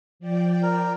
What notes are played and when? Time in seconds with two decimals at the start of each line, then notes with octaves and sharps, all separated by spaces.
0.20 F3 D5 G5
0.63 A#4